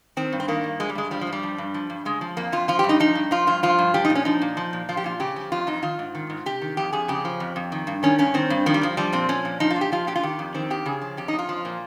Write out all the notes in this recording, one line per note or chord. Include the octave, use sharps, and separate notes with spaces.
D#3 C4
G2
C4
D#3 A#3
G2
F3 G#3
G3
G2 G#3
F3 G3
F3
G2
G3
F3
G2
F3
G2
C#3 G#3
F3
F2 A#3
F2 F4
F3 F4
G4
G2
D#4
F3 D#4
G2
F3 F4
G2 F4
F3 F4
G2
F3 G4
D#4
A#2
C#4
F3 D#4
A#2
F3
A#2
F3 F4
G4
A#2 F4
C#3 G4
F3
F2 F4
F2 D#4
D#3 F4
G#2
D#3
G#2
C3 G4
D#3
F2 G4
F2 G#4
C#3 G4
F3
F2
F2
D#3
G2
D#3 C#4
G2 C#4
D#3 C4
G2
D#3 F3
G3
G2 F3
F3 G3
A#2 C4
F3 C#4
A#2
F3 D#4
F4
A#2
G4
F3 F4
A#2 G4
F4
D#3 G4
F2
D#3 C4
F2 G4
C#3 G#4
F3
F2 G4
F2 D#4
F4
F3
A#2